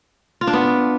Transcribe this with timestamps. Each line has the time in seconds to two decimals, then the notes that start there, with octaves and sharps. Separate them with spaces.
0.41 F4
0.47 D4
0.53 B3